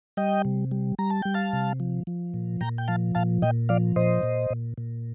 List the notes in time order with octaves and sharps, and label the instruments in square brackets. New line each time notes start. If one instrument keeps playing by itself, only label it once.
[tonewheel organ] G3 D#5 G5
C3
G3
G3 A#5
A5
G3 G5
F5 A5
C3
F3
F3
A#2
A#2 G5 A#5
G5
F3 F5 A5
A#2 F5 A5
A#2 D#5 G5
F3 D5 F5
A#2 C5 D#5
A#2
A#2
A#2